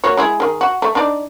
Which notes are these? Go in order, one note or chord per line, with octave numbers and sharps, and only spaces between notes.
A#3 F#4 C#5
G#3 E4 G#4
D#3 G#4
F#4
A3
D4 D#4 D5